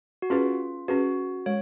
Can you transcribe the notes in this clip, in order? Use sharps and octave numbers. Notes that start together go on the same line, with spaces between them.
F#4
C#4 F4 G#4 B4
C#4 F#4 G#4 B4
G#3 C#5